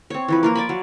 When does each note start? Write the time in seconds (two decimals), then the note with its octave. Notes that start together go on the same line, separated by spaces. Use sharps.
0.10 C4 C#5
0.28 E3 F3 B4
0.43 A#3 F4 A#4
0.55 D5 G#5 B5
0.69 F#3